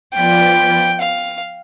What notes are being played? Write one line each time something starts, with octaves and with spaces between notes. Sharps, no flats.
F3 B3 F4 B4 D5 G5
F5